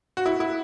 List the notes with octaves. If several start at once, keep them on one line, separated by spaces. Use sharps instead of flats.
F#4
E4
E4